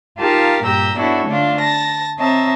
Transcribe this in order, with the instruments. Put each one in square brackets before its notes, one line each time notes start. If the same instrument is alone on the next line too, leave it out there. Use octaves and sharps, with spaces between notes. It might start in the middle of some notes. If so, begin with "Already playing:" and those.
[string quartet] D#4 F4 G4 A#4 F5 A5
G2 A#2 G4 A#5 E6 G6
B3 D4 E4 F#4 A4 C#5
D3 A3 D4 F4
A5 A6 A#6
C4 C#5 D#5 E5 A5 A#5